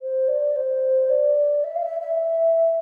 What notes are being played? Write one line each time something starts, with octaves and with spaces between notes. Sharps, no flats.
C5
D5
C5
D5
E5
F5
E5
E5